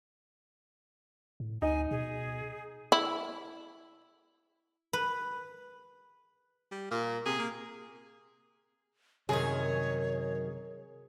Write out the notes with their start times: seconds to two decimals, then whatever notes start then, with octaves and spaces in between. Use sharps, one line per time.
1.40 A2
1.62 D2 D#4 G#5
1.91 B2 G#4
2.92 E4
4.93 B4
6.71 G3
6.91 A#2 A#3
7.26 C3 G#4
7.39 A#3
9.29 F#2 C3 D#3 G#4 C#5